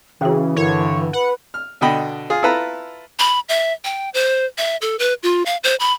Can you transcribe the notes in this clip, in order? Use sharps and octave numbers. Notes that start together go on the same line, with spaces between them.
C#3 E3 F#4 G#4 G5
G2 D3 E4 A#4 C#5
B4 F#5
F6
B2 D3 D#5 G5 B5
F4 G#4
E4 F4 A4 B4 A#5
B5
E5
G5
C5
E5
A4
B4
F4
F5
C5
B5